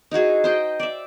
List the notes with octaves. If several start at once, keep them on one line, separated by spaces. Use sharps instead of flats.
D#4 E4 F#4 G#4
C5 D#5 G5
D5 E5